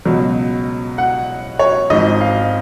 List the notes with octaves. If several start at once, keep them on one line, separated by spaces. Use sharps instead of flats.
C#2 B2 F#3
F#5
C#5
G#1 G#2 F3 D#5
F5